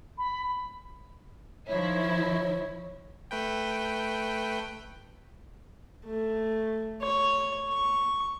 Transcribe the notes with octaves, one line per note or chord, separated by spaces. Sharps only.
B5
D#3 F3 E4 C#5
A3 B4 G5
A3
C#5
C#6